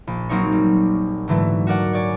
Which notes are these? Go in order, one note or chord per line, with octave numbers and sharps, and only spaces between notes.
A#1
F#3 A#3 C4 D#4 C#5
G3
G#2 D3 E3 F#3 A3
F#4 A#4 D5 F#5
C#5 D5 G#5